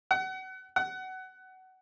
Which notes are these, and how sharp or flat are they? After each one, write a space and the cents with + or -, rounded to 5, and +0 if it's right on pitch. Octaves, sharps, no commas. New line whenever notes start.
F#5 +30
F#5 +20